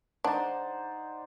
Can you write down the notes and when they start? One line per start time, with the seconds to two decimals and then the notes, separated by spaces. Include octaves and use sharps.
0.24 D4 D#4 C5 D5 F#5